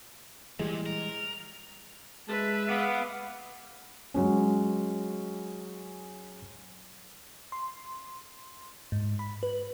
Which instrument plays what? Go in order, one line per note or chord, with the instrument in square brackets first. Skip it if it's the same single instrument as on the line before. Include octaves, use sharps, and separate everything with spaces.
[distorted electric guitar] A#2 [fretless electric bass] E3 G3 G#3
[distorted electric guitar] A#4
[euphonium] G#3 [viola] B4 E5 [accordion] A5
[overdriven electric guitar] B3 [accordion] F5 D6
[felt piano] F#3 G#3 C#4
[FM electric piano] C6
G#2
B5
B4